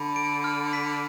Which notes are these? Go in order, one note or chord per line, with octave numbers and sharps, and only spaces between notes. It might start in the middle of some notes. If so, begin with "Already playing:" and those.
Already playing: D3 B5
D7
F6
B6